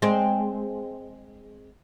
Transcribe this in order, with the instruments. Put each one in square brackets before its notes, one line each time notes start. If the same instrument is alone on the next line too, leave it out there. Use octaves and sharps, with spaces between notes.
[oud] G#3 C4